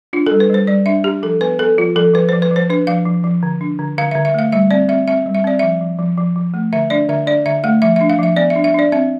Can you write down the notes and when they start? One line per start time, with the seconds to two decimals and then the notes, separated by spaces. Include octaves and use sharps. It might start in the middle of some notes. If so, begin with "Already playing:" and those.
0.13 D4 F4
0.26 G3 A4
0.40 B4
0.50 G3 C5
0.67 G3 D5
0.86 D4 E5
1.04 D4 G4
1.23 F3 A4
1.41 B3 B4
1.59 B3 A4
1.78 F3 F4
1.96 F3 A4
2.14 F3 B4
2.29 F3 C5
2.42 B4
2.51 F3 C5
2.70 D4 B4
2.87 F3 F5
3.05 F3
3.24 F3
3.43 D3
3.61 D4
3.79 D3
3.98 D3 F5
4.11 D3 E5
4.25 E5
4.34 A3 F5
4.52 G3 E5
4.71 C4 D5
4.89 C4 E5
5.08 C4 E5
5.26 G3
5.35 E5
5.44 C4 D5
5.59 F3 E5
5.81 F3
5.99 F3
6.18 F3
6.36 F3
6.54 A3
6.73 D3 E5
6.90 D4 D5
7.09 D3 E5
7.27 D4 D5
7.45 D3 E5
7.64 A3 F5
7.82 F3 E5
7.96 D4 E5
8.10 F5
8.18 F3 E5
8.36 B3 D5
8.50 E5
8.55 D4
8.64 E5
8.74 D4 D5
8.92 C4 E5